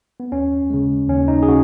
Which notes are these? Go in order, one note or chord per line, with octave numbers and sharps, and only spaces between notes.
B3
D#2 C#4
C#3 G#3
D#2 C#4
D#4
G#4
C#3 F#4